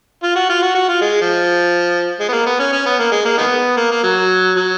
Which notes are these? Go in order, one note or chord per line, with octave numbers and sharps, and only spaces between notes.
F4
F#4
F4
F#4
F#4
F4
G#3
F3
G#3
B3
A#3
B3
C#4
C#4
B3
A#3
G#3
A#3
D#3 G#3 B3
A#3
A#3
F#3
F#3